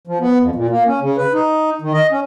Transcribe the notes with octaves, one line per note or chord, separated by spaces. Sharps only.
F3
B3
F2
A#2
A#3
C#4
C#3
B4
D#4
D#3
D#5
C#4